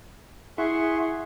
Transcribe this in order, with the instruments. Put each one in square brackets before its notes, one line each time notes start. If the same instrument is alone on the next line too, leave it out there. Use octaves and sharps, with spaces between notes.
[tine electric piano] E4 [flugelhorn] G#4 [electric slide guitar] E5 [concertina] F#5 C6 C#6